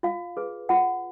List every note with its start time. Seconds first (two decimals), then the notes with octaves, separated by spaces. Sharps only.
0.03 F4 F5
0.37 G#4 B4
0.69 F4 F#5